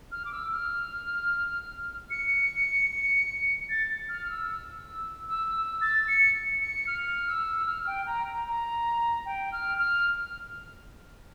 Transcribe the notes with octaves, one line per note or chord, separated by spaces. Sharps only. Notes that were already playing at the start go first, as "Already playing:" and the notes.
F6
D6
E6
F6
C#7
A6
F6
E6
E6
E6
A6
C#7
C#7
F6
E6
F6
G5
A#5
A#5
A#5
G5
F6
F6